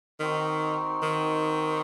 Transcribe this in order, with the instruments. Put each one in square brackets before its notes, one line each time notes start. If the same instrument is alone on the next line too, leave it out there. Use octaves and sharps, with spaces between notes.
[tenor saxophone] D#3 [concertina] C4 D#4 F#4
[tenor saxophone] D#3